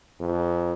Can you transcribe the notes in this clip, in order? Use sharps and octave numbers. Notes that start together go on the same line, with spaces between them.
F2